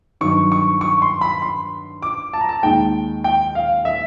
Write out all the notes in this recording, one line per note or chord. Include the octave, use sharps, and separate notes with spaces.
G2 D#3 F#3 C#6
C#6
C#6
C6
B5
C6
D6
A5
A#5
A5
D#2 D#3 G#3 G5
G5
F5
E5